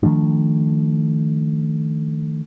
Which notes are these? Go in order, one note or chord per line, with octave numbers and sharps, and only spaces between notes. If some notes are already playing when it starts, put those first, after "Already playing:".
D#3 F3 A3 D4